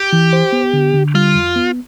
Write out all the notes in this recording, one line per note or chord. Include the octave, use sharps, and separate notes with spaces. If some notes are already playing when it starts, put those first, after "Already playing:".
Already playing: G4
E3
C5
B3
D3
D3
G3 F4
F2
B3